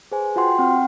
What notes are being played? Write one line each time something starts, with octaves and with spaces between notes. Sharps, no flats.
G#4 B4 C5 G#5
F4 F#4 F#5 G5 C6
C4 F#5 G5 F6